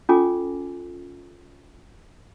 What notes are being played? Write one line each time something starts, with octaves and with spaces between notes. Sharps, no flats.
C#4 F4 A4 G#5 D6